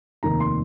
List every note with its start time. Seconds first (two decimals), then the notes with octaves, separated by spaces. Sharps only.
0.23 F1 D#2 D#3 A#5
0.40 C6